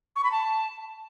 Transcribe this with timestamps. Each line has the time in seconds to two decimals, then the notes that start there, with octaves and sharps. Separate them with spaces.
0.16 C#6
0.24 B5
0.32 A5